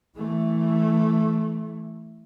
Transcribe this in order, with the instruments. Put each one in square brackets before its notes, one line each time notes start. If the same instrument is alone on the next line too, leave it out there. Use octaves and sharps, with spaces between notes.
[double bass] E3 A3